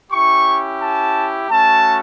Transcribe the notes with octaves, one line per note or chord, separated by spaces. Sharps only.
C#4 E4 G4 C#6
A5
A3 C#4 F#4 A5